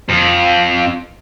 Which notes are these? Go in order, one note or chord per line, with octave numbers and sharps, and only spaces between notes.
F2